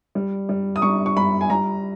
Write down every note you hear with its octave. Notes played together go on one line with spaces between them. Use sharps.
G3
G3
D#6
G3 C#6
C#6
G3 B5
G#5
G3 A#5